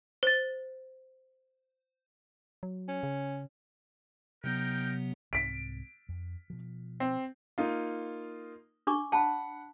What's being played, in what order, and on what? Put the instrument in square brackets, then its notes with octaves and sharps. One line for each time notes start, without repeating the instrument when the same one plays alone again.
[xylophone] C5 A6
[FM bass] F#3
[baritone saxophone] C#4
[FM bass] C#3
[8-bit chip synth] C3 F#3 B3 [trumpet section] D#4 A#4 G5
[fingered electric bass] C2 G#2 C4 [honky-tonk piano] B6 D7
[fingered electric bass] F2
B2 F3
[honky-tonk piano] C4
[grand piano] A#3 D#4 F4
[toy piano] D4 C#6 D6
[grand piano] F#5 B5 [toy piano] A5